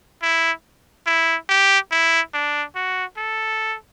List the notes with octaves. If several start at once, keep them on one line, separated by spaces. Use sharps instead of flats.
E4
E4
G4
E4
D4
F#4
A4